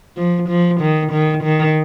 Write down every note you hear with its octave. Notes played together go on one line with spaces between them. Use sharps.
F3
F3
D#3
D#3
D#3